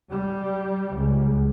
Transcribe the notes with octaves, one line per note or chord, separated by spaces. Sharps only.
G3
C#2